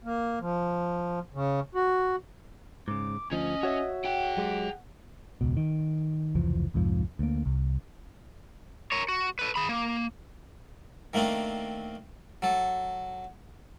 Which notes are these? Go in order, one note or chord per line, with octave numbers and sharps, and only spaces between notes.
A#3
F3
C#3
F#4
G#2 C#3 D6
D2 F3 C#4 D#5
F#4 C#5 E5
G#4 F#5 G5
F#3 G#3 G4
E1 C#2 B2
D#3
F1 C#2 E3 F3
C2 F2 G#2 F3
D2 A#3
C2
A#4 C#5
F#4
A4 B4
G#4 B5
A#3
D#3 A3 A#3 C4 D4
F#3 A4